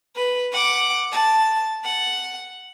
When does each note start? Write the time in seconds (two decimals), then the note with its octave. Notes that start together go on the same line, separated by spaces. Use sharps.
0.15 B4
0.52 F#5 D6
1.11 A5
1.84 F#5